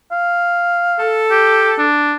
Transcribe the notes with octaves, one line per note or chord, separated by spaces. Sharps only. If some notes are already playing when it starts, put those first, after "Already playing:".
F5
A4
G4
D4